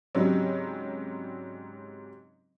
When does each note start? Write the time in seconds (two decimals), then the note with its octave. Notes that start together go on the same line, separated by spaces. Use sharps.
0.15 G#2 C#3 F#3 G3 C4 C#4